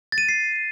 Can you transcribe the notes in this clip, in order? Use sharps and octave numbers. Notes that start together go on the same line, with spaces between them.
A6
D#7
A6
C7